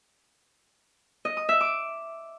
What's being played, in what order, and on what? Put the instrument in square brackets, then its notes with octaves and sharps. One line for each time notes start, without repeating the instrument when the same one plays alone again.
[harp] D#5
D#6
E5
D6